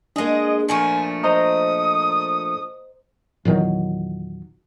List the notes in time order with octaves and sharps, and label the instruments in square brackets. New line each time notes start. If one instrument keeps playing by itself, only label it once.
[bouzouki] G#3 G#4 [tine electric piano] A#3 D4 [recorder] D#5
[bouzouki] A#2 F3 A3 [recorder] G#5
[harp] C5 D#5 A#5 [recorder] D#6
[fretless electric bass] E2 A#2 D#3 F#3